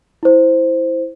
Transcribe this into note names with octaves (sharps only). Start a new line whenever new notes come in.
E4 C5